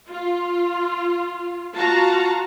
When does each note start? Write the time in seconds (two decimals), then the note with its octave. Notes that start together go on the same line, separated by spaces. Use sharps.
0.11 F4
1.75 F4 F#4 A5 A#5